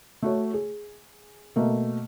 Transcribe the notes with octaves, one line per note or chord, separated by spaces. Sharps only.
A3 F#4 C#5
G#4
B2 A3 A#3